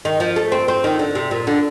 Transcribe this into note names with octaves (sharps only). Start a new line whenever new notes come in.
D#3
F3
A3
C4
C4
D#3
D3
C3
A#2
D3